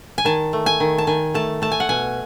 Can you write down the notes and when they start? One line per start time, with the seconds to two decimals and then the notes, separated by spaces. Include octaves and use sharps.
0.18 G#5
0.25 D#3 A5
0.53 A3
0.66 G#5
0.80 D#3
0.98 A5
1.07 D#3 G#5
1.34 A3 A5
1.62 A3 A5
1.72 G#5
1.80 F#5
1.89 B2 G#5